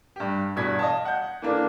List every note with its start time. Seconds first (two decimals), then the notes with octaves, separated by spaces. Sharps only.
0.16 G2 G4
0.56 E2 G2 B2 G#6 B6
0.79 D#5 F5 A5
1.05 F#5 G6
1.42 E3 A#3 D4 A4